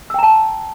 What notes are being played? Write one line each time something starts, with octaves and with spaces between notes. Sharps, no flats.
G5 A5 A#5 E6